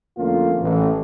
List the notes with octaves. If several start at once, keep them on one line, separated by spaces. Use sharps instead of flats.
F2 D3 A3 A#3 C#4 F4
A1